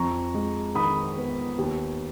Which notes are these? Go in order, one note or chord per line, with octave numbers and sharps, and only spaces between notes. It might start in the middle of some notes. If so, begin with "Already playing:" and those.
Already playing: F2 A#5 C#6
G#3
D#3 B5 D#6
B3
D#2